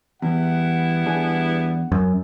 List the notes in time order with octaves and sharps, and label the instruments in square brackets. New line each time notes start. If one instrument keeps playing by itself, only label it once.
[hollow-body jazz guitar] E2 [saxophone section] G3 B3 E4 [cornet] F#5
[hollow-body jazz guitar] E2 D4 G#4
[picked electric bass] F#2